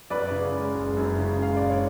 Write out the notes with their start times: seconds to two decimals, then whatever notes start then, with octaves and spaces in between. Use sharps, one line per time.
0.10 F#2 B4 D5
0.32 C#3
0.54 G#3
0.75 F#1
0.97 F#2
1.19 C#3
1.40 G#3 F5
1.56 D5
1.62 F#1
1.70 C#5